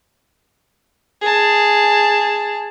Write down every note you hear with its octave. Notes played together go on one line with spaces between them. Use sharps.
G#4 A5